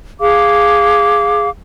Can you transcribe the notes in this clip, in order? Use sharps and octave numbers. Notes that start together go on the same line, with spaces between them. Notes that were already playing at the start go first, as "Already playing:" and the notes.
G#4 F5 D6